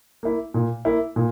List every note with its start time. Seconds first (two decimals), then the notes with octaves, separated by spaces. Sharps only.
0.23 A#3 E4
0.54 A#2
0.85 A#3 E4
1.16 A#2